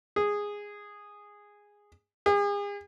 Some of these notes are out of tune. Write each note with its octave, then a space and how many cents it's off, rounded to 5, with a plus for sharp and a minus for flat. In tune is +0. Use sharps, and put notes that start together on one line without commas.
G#4 -10
G#4 -40